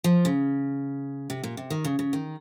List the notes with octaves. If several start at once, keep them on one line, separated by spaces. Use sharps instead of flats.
F3
C#3
C3
A#2
C3
D#3
C#3
C#3
D#3